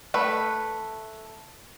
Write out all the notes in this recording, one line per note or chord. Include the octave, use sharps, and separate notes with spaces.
A3 B4